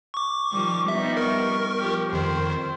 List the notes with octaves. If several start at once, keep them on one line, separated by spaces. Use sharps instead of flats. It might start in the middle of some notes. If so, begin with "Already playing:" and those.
C#6 D6
D#3 F3 G3
G3 B3 D#4 E5
A#4 C#6
F3 G4
F2 D#3 C5